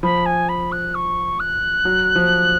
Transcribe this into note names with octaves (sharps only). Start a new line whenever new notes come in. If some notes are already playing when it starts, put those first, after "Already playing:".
F3 B5
G#5
B5
F#6
C#6
F#6
F#3
F3